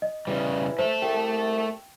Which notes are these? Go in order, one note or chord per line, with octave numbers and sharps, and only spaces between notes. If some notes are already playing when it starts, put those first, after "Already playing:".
D#5
C#3 E3 G3
A3 A4 C5
C2 G5